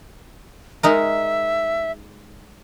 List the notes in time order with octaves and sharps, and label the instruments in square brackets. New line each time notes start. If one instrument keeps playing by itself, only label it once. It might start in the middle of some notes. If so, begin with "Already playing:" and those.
[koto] G#3 D#4 A#4 [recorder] E5